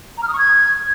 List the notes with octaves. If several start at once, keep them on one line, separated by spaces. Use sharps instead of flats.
A#5
F6
D#6
C#6
G#6